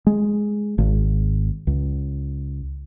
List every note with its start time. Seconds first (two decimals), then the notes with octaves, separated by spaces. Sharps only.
0.07 G#3
0.78 G#1
1.67 C#2